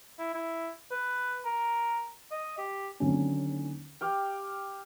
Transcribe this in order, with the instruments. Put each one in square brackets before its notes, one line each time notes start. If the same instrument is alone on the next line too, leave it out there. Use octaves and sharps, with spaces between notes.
[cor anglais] E4
E4
B4
A#4
D#5
G4
[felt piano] D#2 D3 F#3 C4 C#4
[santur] G4 F5 G5